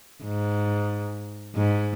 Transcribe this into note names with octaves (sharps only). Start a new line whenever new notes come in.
G#2
G#2